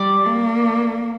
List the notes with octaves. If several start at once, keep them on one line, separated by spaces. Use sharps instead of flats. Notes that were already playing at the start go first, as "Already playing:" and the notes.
Already playing: G3 D5
A#3